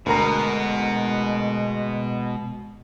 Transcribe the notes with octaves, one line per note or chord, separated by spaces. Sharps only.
D2 B2 G#3 A#4 A#5